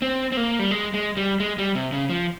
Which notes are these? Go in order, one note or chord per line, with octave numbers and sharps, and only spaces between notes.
C4
C4
A#3
G3
G#3
G#3
G3
G#3
G3
C3
C#3
F3